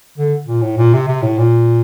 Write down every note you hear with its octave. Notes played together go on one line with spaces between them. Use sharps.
D3
A#2
A2
A#2
C3
C3
A2
A#2